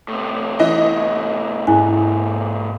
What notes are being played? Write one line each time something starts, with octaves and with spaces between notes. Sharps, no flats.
A2 C3
E3 D#5
G#2 C#4 E4 A#4 G#5